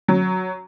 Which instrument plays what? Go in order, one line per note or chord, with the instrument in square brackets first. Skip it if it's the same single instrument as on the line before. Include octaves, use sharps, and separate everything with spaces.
[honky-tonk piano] F#3